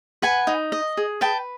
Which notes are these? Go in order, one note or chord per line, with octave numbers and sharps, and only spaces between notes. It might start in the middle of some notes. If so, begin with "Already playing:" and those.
B4 F#5 G#5
D#4
D#5
G#4
B4 G5 A5